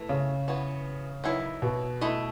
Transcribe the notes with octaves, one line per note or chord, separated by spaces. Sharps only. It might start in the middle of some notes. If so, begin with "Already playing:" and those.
Already playing: E3 A3
C#3
E3 B3 F#4 C#5
D#3 F#3 B3 E4
B2
A3 E4 A4 D#5